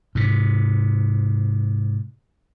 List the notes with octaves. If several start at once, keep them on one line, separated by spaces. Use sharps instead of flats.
G#2 C3